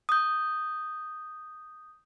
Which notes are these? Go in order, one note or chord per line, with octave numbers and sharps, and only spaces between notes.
D#6 G6